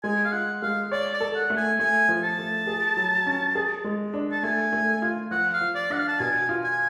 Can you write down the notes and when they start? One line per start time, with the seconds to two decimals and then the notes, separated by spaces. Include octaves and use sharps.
0.03 G#3 G#5
0.25 F5
0.32 F4 F#5
0.62 G#3 F5
0.92 C#5 D5
1.13 D5
1.20 A4
1.36 F#5
1.50 A3
1.57 G#5
1.79 A3 G#5
2.09 F3
2.23 A5
2.39 A3
2.67 G#4
2.97 F#3
3.26 C#4
3.55 G#4
3.84 G#3
4.14 D4
4.32 A5
4.43 A3 G#5
4.72 A3
5.02 F4
5.31 F3 F#5
5.53 F5
5.61 F3
5.75 D5
5.90 D4 F#5
5.98 F5
6.08 A5
6.19 B2 G#5
6.49 F4
6.64 G#5